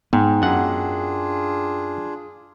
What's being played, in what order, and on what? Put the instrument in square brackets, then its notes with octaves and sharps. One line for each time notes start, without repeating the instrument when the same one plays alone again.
[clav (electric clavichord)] G#2 [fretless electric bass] B3 [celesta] G5
[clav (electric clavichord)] F#2 F#5 [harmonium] D4 F4 G#4